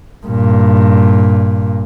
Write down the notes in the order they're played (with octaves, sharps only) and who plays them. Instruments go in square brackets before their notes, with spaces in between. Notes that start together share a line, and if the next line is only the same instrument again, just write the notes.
[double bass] G2 A#2